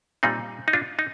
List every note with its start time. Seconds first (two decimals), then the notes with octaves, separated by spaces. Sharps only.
0.23 A#2 G3 C4 D#4
0.68 D#4
0.73 D4 F4
0.99 D#4